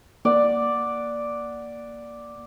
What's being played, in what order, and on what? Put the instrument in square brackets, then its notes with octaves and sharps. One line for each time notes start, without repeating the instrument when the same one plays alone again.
[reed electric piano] A#3 [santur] D5 F#5